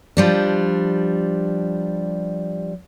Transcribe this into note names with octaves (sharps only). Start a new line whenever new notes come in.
F3 G3 D4